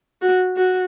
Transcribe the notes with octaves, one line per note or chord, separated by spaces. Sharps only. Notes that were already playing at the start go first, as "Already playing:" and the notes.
F#4
F#4